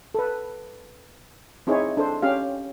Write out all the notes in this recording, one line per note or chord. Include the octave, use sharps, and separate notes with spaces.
A4 B4
C4 D#4 E4 G#4 C5 C#5
D4 A4 C5
C#4 G4 F5